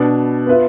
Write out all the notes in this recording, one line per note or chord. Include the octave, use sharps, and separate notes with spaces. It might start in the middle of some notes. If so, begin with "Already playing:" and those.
Already playing: B2 B3 D4
B3 F4 B4 E5